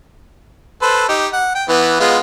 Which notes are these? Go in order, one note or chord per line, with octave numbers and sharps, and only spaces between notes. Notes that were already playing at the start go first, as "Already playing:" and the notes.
A4 B4 C5
D#4 G4
F#5
G5
E3 B3
G#3 B3 F4